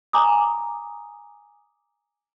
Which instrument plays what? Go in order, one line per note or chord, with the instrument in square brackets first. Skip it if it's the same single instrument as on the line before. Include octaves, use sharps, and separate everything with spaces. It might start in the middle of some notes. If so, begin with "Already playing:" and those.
[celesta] G#5 A#5 D6 D#6